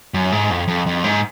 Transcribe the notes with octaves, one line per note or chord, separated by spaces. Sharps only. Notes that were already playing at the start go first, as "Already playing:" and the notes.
F#2
G#2
F2
F2
F2
G#2